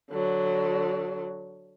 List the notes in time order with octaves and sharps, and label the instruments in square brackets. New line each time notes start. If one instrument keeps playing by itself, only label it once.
[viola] D3 F#3